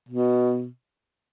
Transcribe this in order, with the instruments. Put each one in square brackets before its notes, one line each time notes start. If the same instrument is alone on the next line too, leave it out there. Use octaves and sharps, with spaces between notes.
[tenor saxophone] B2